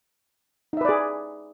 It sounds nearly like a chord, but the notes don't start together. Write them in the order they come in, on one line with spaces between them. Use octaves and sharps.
D#4 E5 B4 D5 G#4